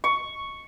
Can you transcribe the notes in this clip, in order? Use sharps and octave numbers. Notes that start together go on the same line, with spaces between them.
C#6